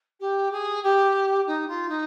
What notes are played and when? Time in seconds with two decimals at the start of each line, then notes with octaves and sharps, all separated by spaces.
0.20 G4
0.51 G#4
0.83 G4
1.46 D#4
1.67 F4
1.88 D#4